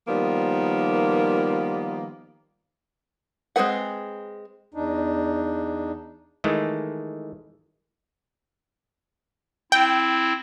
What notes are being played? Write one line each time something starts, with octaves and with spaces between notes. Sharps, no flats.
D#3 F3 G3 A#3 B3
G#3 C4 G#4 B4 F#5
E2 D4 D#4
D#3 E3 G#3 A3
C4 E4 G5